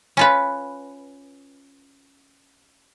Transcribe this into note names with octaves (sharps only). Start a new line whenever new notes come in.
C#4 F4 B4